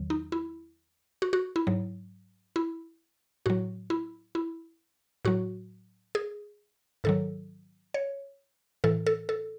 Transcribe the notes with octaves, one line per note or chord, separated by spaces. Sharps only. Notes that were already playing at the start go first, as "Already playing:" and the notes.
Already playing: E2 D#3 F#3
D#4
E4
F#4
F#4
E4
G#2 F#3
E4
A2 F#3 F#4
E4
E4
A2 F#3 F#4
G#4
G#2 D#3 F#3 A4
C#5
A2 E3 A4
A4
A4